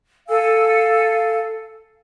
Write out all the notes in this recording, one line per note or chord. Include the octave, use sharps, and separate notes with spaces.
A4 F5 G#5 E6